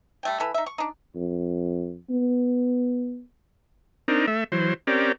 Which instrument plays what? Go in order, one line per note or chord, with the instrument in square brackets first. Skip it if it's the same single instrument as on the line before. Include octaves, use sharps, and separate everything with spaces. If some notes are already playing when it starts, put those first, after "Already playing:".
[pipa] G3 A3 G5
E3 A4 B5
D#4 E5
C#6
D4 D#4
[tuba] F2
B3
[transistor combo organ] C4 D4 D#4 A#4
A3 E5
E3 F#3 C5
C4 C#4 G4 A#4 D5